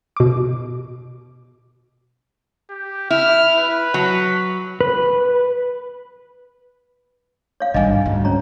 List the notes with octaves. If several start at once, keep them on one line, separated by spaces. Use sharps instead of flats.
B2 D6
G4
E4 F6
B4
F#3
B4
C#5 F5
G#1 G2 D3 G3 D#5 F5 G#5
D2 G#2
C#4 C#5 A#5